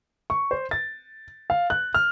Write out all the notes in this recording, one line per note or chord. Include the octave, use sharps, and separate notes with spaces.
C#6
C5
A6
F5
F#6
F6